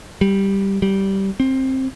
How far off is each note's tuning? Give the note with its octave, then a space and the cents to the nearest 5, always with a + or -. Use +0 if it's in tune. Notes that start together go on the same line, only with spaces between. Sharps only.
G3 +0
G3 -15
C4 +15